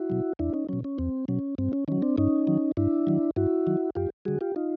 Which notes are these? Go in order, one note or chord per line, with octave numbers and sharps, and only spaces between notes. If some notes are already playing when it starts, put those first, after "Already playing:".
Already playing: E4 F#4
B2 F#3
E2 D4 E4
C#4 D#4
B2 F#3 C#4
C#4
E2 C4
B2 F#3 C#4
G2 C4
C#4
D#3 F#3 C#4
C4 D4
G2 C#4 D#4
D#3 F#3
G2 D4 E4
D#3 F#3
G2 E4 F#4
D#3 F#3
F#2 F4 G4
D3 G3 F#4 G#4
F4 G4
D#4 F4